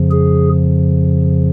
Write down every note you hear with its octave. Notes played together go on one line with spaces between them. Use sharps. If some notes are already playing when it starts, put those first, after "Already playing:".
Already playing: F2 C#3 F3
G#4